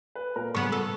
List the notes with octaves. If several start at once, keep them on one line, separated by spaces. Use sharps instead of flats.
B4
A#2 A#4
C#3 B3 C#6
A4